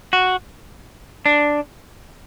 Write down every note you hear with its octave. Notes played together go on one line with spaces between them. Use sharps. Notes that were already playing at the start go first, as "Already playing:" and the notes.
F#4
D4